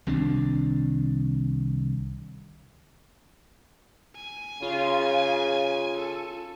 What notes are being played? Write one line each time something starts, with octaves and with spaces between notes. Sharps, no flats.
C2 D#3 C4 D4
G#5
C#3 F4
A4